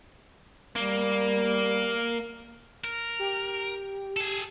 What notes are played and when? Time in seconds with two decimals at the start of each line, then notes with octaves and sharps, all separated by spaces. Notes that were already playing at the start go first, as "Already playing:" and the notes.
0.76 G3 A#3
2.84 A#4
3.19 G4
4.17 G#4 A4